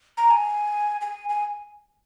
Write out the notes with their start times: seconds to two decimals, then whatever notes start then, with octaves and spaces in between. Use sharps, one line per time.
0.17 A#5
0.30 G#5
1.01 G#5
1.29 G#5